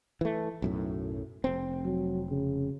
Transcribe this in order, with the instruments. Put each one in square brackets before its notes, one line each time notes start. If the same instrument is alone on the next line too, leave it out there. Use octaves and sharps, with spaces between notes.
[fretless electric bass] E3 A3
B1 F#2 A2
F1 C4
[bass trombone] F#3
C#3